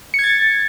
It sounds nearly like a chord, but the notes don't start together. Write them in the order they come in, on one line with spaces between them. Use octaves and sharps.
C#7 G#6 A6